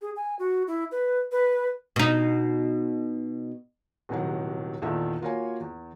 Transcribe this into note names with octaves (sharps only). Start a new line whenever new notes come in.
G#4
G#5
F#4
E4
B4
B4
B2 D#4
D#1 A2 C3 D#3 F#3 F#5
E2 A#2 D#3 A4 E5
A#3 F4 F#4 A#4 C#5 G#5
E2